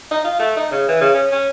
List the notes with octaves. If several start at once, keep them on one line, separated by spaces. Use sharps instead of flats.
D#4
F4
A3
D#4
C#3
E3
C#3
C#4
C#4